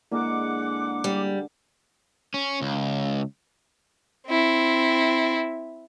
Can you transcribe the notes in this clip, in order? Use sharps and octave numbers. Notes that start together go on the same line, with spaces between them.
D3 G#3 A#3 E4 A#4 F#5 D6
G3
C#4
C#2
C4 E4